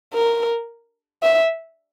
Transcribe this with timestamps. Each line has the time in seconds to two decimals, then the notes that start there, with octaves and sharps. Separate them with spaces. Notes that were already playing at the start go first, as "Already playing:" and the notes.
0.14 A#4
1.23 E5